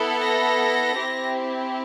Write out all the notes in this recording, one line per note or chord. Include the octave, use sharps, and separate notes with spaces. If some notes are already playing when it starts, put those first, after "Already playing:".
Already playing: B3 E4 A4
A#6
C4 E4 G4